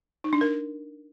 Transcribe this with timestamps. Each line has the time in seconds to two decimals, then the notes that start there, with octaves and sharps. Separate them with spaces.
0.24 D#4
0.33 D4
0.41 A#4